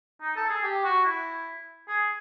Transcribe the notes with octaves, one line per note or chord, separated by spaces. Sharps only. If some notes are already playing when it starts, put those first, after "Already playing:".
D#4
A4
G#4
G4
F#4
E4
G#4